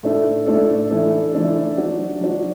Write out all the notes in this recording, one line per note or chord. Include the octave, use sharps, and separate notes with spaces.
A2 A3 D4 A4
A2 A3 D4 A4
E3 A3 D4 A4
E3 A3 D4 A4
F#3 D4 F#4
F#3 D4 F#4